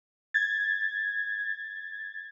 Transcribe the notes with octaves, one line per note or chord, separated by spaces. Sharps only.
G#6 A6